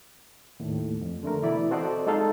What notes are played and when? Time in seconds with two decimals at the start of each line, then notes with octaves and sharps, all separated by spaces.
0.60 D#2 A2
1.01 F2
1.23 D3 A3 A#4
1.42 B2 E3 B3 E4 D5 B5
1.71 C4 F#4 A4 C5 D5 D#5
2.07 G#3 D#4 F4 A4 F5